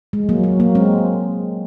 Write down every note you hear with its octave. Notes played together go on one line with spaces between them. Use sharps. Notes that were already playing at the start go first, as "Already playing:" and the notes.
G#3
F#3 A#3
F#3
F#3 A#3
G#3 C4